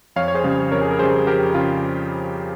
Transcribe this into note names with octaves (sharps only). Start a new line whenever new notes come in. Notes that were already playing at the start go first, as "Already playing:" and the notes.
F2 C#5 F5
C#5
G#4 C5
C#3 G3
F2 A#4 C#5
G#4
A#4
C#3 G3 G#4 C5
F2 G4 A#4
C#3 F4